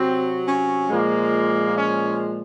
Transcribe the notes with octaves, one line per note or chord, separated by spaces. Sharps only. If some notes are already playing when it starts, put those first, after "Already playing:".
Already playing: C3 F#3 C4
C#4
A#2 F3 G#3 A#3
C#4